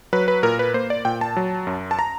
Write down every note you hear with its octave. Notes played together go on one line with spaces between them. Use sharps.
F#3 B4
B4
A#2 A#4
B4
A#3 C5
D5
A#2 G5
A5
F#3
F#2
A5
A#5